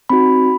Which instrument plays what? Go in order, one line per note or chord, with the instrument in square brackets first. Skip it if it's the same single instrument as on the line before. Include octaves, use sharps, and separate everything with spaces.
[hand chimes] C4 D#4 F#4 B5